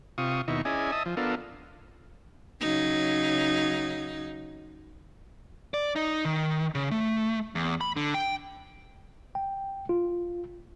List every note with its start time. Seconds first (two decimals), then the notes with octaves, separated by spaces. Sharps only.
0.18 C3 F4 C#6 D#6
0.48 D#2 B2 D#4 E4 C#6
0.65 C#4 E4 G#4 D5 D#5 G#5
0.92 D#5 E5 A5 D#6
1.06 F3
1.17 B3 D4 F4 A4 A#4
2.61 C#3 F#3 D#4
5.74 D5
5.96 D#4
6.25 D#3
6.75 C#3
6.91 A3
7.55 E2
7.81 B5
7.96 D3
8.14 G5
9.35 G5
9.89 F4